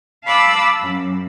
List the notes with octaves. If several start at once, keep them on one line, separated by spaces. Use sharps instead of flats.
F5 A5 B5 D6 E6 F#6
F#2